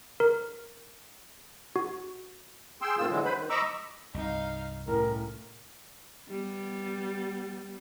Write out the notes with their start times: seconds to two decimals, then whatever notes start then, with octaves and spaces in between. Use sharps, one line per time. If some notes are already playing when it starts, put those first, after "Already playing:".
0.20 A#4
1.76 F#4
2.82 G#4 G5 C6 E6
2.98 A2 C3 D#3 F4 E6
3.10 D3 E3 F#3 G#3
3.25 B4 C5 B5
3.37 D#3
3.50 D#5 A#5 B5 C#6 D6 E6
4.14 C2 G2 C3 D#4 F5
4.88 A2 C#4 A#4
6.30 G3 B3